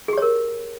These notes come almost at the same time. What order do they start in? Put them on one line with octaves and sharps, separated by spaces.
G#4 G4 C#5 A#4